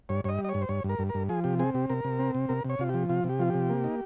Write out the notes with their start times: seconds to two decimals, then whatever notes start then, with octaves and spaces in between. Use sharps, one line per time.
0.09 G2 C#5
0.24 G2 C#5
0.29 D#5
0.39 G3
0.44 D#5
0.49 C#5
0.54 G2
0.62 C5
0.69 G2 C#5
0.84 G2
0.89 A#4
0.99 G2
1.09 A#4
1.14 G2
1.29 F3 G#4
1.44 C3 G4
1.59 C4 G#4
1.74 C3 G4
1.90 C3 A#4
2.04 C3
2.19 C4
2.35 C3
2.49 C3 A#4
2.64 C3
2.70 C#5
2.79 C3 F4
2.89 F3 G4
3.09 C3 F4
3.24 C3
3.29 G4
3.39 F3 F4
3.49 C3 G4
3.70 A#3
3.84 D#4